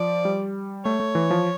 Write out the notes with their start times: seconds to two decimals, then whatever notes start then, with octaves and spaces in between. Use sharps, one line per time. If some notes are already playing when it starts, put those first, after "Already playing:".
Already playing: F3 D5
0.25 G3
0.85 A3 C#5
1.00 A3
1.15 E3
1.31 F3